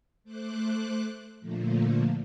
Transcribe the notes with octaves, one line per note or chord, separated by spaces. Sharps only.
A3 C5 D6 F#6
A#2 D3 F3 A3 A#3